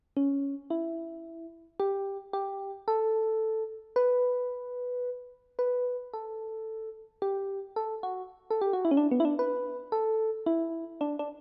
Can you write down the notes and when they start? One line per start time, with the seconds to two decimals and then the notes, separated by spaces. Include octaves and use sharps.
0.17 C#4
0.70 E4
1.80 G4
2.33 G4
2.88 A4
3.96 B4
5.59 B4
6.13 A4
7.22 G4
7.76 A4
8.03 F#4
8.51 A4
8.61 G4
8.73 F#4
8.85 E4
8.91 C#4
8.97 D4
9.11 B3
9.20 E4
9.25 D4
9.39 B4
9.92 A4
10.46 E4
11.01 D4
11.19 D4